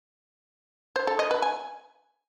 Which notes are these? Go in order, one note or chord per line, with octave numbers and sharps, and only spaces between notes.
C5
A4
D#5
B4
G#5